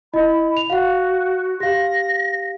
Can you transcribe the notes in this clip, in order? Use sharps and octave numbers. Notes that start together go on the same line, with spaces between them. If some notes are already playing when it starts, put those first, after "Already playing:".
E4 D#5 B5
F7
F#4 F5 F#5
G4 F5 A#6